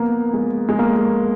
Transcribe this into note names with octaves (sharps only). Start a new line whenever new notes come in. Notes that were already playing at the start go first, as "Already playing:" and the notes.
Already playing: A#3 B3
G#3
G#3
A#3